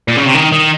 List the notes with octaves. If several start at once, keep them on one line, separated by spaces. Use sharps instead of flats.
A#2
C#3
C3
D#3
D#3